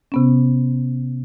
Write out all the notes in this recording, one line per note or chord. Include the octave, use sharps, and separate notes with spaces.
C3 B3 C#4